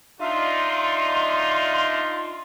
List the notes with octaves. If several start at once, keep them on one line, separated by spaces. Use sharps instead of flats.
D4 D#4 F4 E5 F5 C6